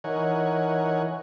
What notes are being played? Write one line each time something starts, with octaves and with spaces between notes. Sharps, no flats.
E3 D#4 A#4 C#5 F#5 G#5